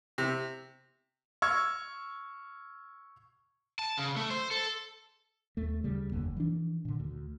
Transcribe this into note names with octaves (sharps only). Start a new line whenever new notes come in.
C3
C#6 E6 F6 G#6
A5
C#3
A3
C5
A4
D#2 A3
D2 C#3 G3
F#1 E2 D3 A#3
E3 F3 D4
A#2 D3
D2